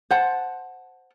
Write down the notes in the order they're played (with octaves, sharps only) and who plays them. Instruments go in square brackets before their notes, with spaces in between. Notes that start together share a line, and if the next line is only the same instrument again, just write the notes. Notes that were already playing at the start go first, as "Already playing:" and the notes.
[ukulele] C5 F#5 A5